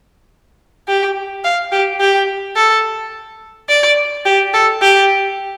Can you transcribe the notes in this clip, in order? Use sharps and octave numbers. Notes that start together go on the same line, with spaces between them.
G4
F5
G4
G4
A4
D5
G4
A4
G4